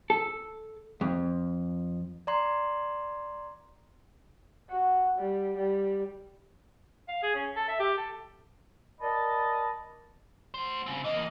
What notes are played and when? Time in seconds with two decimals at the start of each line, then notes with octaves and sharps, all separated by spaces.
0.10 A4
1.01 F2
2.27 D5 A#5 C6
4.70 F#4
5.18 G3
5.57 G3
7.08 F5
7.23 G#4
7.35 C#4
7.56 A4
7.68 E5
7.80 G4
7.97 A4
9.00 A#4 D5 D#5 A5 B5
10.54 F#4 C5
10.86 C#3 C4
11.04 E3 A#3 D#5